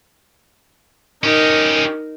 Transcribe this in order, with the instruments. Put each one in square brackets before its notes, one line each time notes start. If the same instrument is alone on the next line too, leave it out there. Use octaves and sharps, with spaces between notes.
[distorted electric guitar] C#4 G4 [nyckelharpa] D#4 A#4